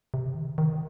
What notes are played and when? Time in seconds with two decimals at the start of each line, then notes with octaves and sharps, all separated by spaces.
0.14 C3
0.35 D#3
0.58 D#3